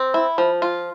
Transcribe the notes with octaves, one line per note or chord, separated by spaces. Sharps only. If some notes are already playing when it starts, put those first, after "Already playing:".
Already playing: C4
E4
F3
F4